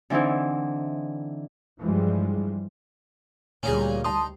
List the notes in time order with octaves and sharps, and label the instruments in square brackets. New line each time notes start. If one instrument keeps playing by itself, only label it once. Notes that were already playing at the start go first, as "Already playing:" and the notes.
[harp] D3 E3 C4 D#4 E4
[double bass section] G2 E3 F3 G3 G#3
[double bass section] D2 G3 [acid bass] A#2 [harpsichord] C#4 D#4 G#4
[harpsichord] D#4 [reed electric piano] A5 C6 D#6